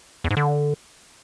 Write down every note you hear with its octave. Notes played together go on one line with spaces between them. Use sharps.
E2
G#2
D3